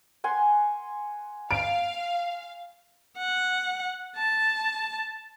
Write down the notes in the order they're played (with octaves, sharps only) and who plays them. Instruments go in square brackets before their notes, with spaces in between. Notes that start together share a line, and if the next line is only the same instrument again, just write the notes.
[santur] F#5 G#5 C6
[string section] F5 [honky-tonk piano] D7
[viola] F#5
A5